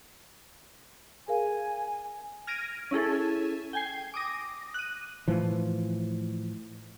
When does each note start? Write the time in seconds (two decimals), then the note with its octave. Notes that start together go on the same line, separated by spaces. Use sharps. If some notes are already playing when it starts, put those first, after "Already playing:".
1.28 G#4 A#4 F5 G#5
2.47 F6 G#6 A#6 D7 D#7
2.91 C#4 E4 G#4 A4
3.73 G5 G#5 C7
4.14 D6 D#6 A#6
4.74 F#6 D#7
5.28 A2 E3 F3